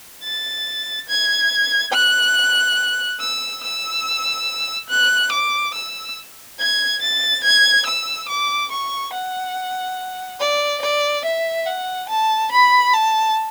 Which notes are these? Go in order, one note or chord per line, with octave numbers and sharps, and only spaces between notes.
A6
G#6
F#6
E6
E6
F#6
D6
E6
G#6
A6
G#6
E6
D6
C#6
F#5
D5
D5
E5
F#5
A5
B5
A5